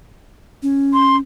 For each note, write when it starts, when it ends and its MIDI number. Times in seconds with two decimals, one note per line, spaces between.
0.63 1.20 61
0.93 1.16 84